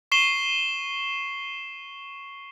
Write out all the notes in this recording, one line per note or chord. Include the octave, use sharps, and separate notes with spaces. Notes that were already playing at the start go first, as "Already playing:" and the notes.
C#6 C7 E7 G7